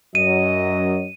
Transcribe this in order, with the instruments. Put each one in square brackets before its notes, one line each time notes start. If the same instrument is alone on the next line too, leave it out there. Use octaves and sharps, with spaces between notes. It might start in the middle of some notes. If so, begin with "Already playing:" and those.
[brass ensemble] F#2 F#3 D#5 [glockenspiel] D#7